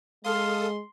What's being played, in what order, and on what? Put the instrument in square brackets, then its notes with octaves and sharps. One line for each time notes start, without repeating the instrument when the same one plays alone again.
[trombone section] G#3 [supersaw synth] A4 D#6 [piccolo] F5 [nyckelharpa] C6